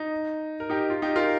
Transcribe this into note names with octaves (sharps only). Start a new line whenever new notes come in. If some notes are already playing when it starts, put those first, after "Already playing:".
Already playing: D#4
A#4
D#4 G4
F4
D#4 G4
F4 A#4